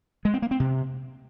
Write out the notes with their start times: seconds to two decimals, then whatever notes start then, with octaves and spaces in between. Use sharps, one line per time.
0.25 G#3
0.34 C4
0.42 A#3
0.51 C4
0.60 C3